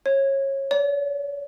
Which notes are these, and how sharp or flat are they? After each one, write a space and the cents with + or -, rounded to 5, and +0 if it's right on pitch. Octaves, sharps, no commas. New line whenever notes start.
C#5 -25
C#5 +45